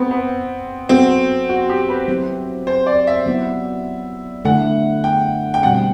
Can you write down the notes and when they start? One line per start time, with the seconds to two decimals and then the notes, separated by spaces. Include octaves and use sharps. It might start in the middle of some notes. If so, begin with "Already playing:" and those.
Already playing: B3 C4
0.11 B3
0.89 F#3 B3 C4 F#4 A4
1.49 F#4
1.69 G4
1.89 B4
2.08 F#3 C4 E4 G4
2.67 C5
2.87 D5
3.07 E5
3.26 F#3 B3 E4
4.45 D3 A3 E4 F#5
5.04 G5
5.54 G5
5.63 B2 G3 C4 F#5
5.74 G5